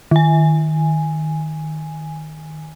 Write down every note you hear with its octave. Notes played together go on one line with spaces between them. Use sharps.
D#3 G#5